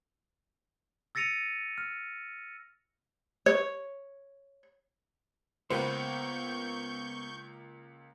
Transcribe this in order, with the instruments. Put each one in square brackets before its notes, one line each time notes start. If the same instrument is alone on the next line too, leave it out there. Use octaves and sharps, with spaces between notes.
[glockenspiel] E6 A6 A#6 C#7 D#7 F7
F6
[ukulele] C#5
[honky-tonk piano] C#2 A#3 C#7 [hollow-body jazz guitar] B3 B4 C5 [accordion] C#6 G6